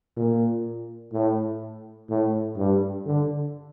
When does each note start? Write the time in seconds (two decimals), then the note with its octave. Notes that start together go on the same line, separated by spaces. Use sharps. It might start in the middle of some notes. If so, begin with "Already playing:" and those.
0.17 A#2
1.13 A2
2.10 A2
2.57 G2
3.06 D3